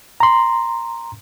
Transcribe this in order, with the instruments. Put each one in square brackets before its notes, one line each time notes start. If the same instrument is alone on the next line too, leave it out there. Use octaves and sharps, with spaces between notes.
[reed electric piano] A#5 C6